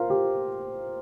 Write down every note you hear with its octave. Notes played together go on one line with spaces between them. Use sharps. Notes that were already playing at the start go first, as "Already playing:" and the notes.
Already playing: F4 A#4 C5
G4